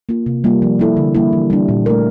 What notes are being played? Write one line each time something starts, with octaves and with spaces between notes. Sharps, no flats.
A#3 F4
C3
G3 A#3 F4
F3
A#3 E4 A4
D3
G3 A#3 E4
E3
G3 D4
A#2
A3 E4 A#4